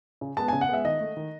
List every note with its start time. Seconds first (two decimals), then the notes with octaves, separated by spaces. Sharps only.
0.21 C#3
0.37 G#3 B3 A5
0.48 C#3 G#5
0.61 F#5
0.69 G#3 B3 E5
0.85 D#3 D#5
1.01 A3
1.17 D#3